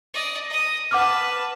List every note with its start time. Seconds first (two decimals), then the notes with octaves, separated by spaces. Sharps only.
0.14 D5 D#5
0.50 D#5 D#6
0.91 B4 F#5 A5 D6 F6